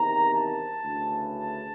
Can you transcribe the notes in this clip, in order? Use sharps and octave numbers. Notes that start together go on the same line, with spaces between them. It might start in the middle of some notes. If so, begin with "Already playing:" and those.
Already playing: E2 C3 D#3 A#5
A5
D2 C#3 E3
A5